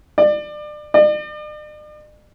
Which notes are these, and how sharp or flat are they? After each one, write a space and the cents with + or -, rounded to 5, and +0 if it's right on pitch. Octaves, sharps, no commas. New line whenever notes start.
D5 +30
D5 +45